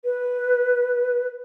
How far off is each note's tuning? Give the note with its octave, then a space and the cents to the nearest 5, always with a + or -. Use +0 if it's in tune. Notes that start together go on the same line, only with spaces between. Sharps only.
B4 -5